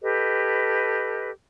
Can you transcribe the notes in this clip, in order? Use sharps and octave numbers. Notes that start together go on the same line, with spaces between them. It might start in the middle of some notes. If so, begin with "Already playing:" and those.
G4 A4 B4 D#5